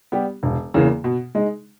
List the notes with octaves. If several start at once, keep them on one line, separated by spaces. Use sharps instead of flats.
G3 B3 G4
E1
E2 C#3 E3 A#3
B2
G#3 D#4